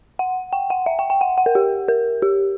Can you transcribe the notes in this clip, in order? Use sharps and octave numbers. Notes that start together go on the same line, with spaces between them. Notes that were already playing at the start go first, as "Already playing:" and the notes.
F#5
G5
F#5
E5
G5
G5
F#5
F#5
A#4
G4
A#4
G4